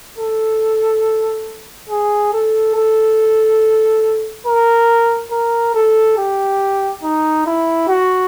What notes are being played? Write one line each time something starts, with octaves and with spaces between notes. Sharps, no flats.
A4
G#4
A4
A4
A#4
A#4
A4
G4
D#4
E4
F#4